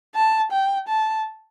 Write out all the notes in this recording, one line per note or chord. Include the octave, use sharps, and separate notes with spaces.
A5
G5
A5